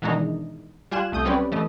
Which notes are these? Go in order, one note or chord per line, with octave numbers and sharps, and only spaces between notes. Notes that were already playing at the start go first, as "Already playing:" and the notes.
B2 D#3 E3 G#3 D4 D#4
G3 F4 G#5 F#6 E7
C2 A3 D#6 G6
F#3 G3 C4 C#4 B4 D5
E3 A3 D#5